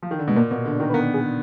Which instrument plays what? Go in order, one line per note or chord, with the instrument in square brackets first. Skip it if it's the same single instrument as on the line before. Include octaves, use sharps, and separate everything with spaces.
[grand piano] F3
D#3
D3
[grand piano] B2 [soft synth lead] G#3
[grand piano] A#2 [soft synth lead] A#3
[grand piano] B2 [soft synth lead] B3
[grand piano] D3
[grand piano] D#3 [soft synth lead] A#4
[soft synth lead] B4
[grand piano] B3 [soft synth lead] A#4
[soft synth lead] G#4